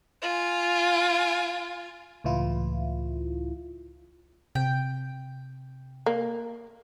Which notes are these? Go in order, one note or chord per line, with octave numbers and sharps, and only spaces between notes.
F4 G#5
C#2 A2 E3 E4 F4
C3 G5
A#3